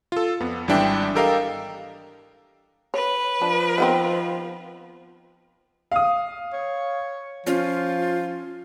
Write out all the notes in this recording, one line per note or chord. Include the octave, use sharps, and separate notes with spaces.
F4 A4
F2 B3
G#1 E3 G3 D4 E5 G5
G4 A4 A#4 D#5 F5 G5
B4 C#5
F3 D4
D#3 B3 C4
F5 D#6
C#5
F3 C#4 F4